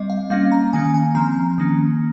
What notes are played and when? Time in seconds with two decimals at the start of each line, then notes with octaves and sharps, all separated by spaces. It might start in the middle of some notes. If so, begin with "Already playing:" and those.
Already playing: G3 C4 D#5
0.10 F5
0.30 G3 A#3 C#4 F5
0.52 A#5
0.73 D#3 A#3 C#4 G#5
0.94 G#5
1.15 F3 C4 A#5
1.58 D#3 A#3 C#4